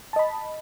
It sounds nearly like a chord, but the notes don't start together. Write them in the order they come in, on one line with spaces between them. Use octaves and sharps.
A5 D#5 B5